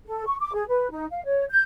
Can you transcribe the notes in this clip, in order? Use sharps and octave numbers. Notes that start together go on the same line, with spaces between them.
A4
C#6
D6
G#4
B4
D#4
F5
C#5
G6